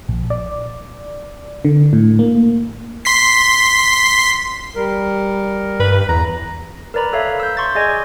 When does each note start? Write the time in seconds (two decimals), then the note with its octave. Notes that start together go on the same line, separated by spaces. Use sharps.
0.09 A#1
0.30 D5
1.65 D3
1.93 A2
2.19 A#3
3.05 C6 B6 C7
4.76 G3 A#4
5.80 G2 B4
6.09 E2 A#5
6.94 A#4 B4 D5 A#5 B5
7.13 A4 C#5 E5 F5
7.40 E6 G6
7.57 C6 C#6 G6 A6
7.75 G#4 D5 D#5 G#5 G#6
7.89 D5